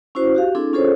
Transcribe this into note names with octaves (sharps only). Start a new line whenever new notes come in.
C#4 E4 F#4 C5
F#4 G4 F5
C4 D4 E4 G#4 A4
C#4 F4 G#4 A4 C5 C#5